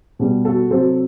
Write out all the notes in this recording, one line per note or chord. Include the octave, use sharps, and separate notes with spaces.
B2 G3
F#4 A4
C3 F#3 A4 C5